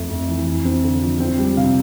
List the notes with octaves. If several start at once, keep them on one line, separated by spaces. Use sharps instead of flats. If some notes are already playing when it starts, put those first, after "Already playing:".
Already playing: F2 A3 E5
F2
E3
E4
C4
D3
F3
C4 G5
G3
C3 F5